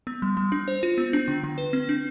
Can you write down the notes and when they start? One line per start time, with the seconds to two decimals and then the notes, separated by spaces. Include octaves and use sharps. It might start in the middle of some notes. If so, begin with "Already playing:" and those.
0.07 B3
0.22 G3
0.37 G3
0.52 D4
0.68 C5
0.83 F4
0.98 B3
1.13 D4
1.28 D3
1.44 D3
1.58 B4
1.73 C4
1.89 D4